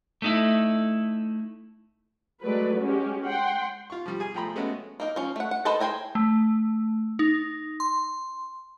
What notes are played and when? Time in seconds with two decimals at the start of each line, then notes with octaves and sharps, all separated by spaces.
0.22 A3 D#4 E4
2.43 F#3 G#3 A3 B4 D5
2.80 G#3 C#4 F#4 G4
3.24 F#5 G5 C6
3.90 F4 C#6
4.06 F3 G3
4.20 G#4 G#5
4.34 F3 A3 G5 A#5 B5
4.56 G#3 A3 B3 C#4 F#4
5.00 A#3 D#4 A#4
5.16 F3 C#4
5.36 A3 F#5
5.51 F#5
5.65 A4 B4 C5 D#5 A5
5.80 G#4 C5 G5 G#5 A#5
6.15 A3
7.19 D#4
7.80 C6